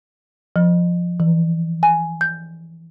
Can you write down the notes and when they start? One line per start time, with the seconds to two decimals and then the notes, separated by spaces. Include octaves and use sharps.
0.56 F3
1.20 E3
1.83 G#5
2.21 G6